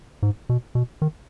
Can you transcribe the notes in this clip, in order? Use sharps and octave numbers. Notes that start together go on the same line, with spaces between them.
G#2
B2
B2
D#3